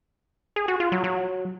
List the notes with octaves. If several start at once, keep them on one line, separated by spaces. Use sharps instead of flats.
G#4
F#4
F4
F#3
F#3